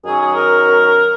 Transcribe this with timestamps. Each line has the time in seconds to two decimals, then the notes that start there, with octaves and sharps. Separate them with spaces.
0.05 F#2 D#3 F#3 C#4 G#4
0.20 G#4
0.34 A#4